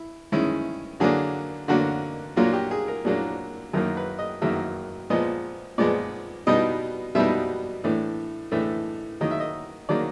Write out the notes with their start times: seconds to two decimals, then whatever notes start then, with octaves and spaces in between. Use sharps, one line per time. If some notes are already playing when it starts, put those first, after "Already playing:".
Already playing: E4
0.32 D#3 G#3 C#4 E4
1.00 D3 F#3 A#3 D4 G#4
1.68 D3 F#3 A#3 D4 F#4
2.36 A#2 F#3 A#3 D4 F4
2.53 G4
2.71 G#4
2.88 A#4
3.05 A#2 F#3 A#3 D4
3.73 F#2 D#3 F#3 A#3 A#4
3.97 B4
4.19 D#5
4.42 F#2 D#3 F#3 A#3 E5
5.10 A#2 F3 G#3 B3 D#5
5.78 A#2 F3 G#3 B3 D5
6.47 B2 G3 B3 D#4 D#5
7.15 B2 G3 B3 D#4 E5
7.84 A2 E3 A3 D4
8.52 A2 E3 A3 D4 E5
9.21 D#3 F#3 A#3 D#5
9.31 E5
9.40 D#5
9.89 D#3 F#3 A#3 D5